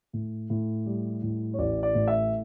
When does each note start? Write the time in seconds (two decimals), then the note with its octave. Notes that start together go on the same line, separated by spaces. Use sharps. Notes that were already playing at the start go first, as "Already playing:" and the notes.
0.13 A2
0.50 A2
0.86 G3
1.23 A2
1.54 C#5
1.59 A1 D5
1.83 D5
1.95 A2
2.08 E5